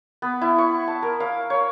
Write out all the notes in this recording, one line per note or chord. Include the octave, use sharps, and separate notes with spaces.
B3
E4
C#6
A5
A#4
F5
C#5